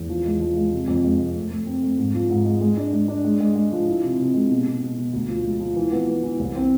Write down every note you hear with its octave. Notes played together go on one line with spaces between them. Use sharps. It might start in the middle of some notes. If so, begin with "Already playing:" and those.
Already playing: E2
F3
G#3
F3
G#3
C3
F2
G#3
C3
A3
A3
C4
A3
G#2
F3
G#2
G#3
G#3
D4
G#3
D4
G#3
G#3
G#3
F3
E4
C3
C3
G#3
B2
B2
B2
B2
D2
F3
G#3
F3
E3
B3
B3
E3
C2
C4